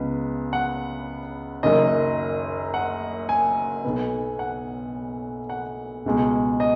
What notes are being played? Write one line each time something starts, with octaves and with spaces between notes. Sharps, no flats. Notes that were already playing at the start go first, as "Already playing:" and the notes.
Already playing: C#2 C#3 B3
F#5
F#1 F#2 D#3 D#5
F#5
G#5
B1 B2 B3
F#5
F#5
C#2 B2 G#3
D#5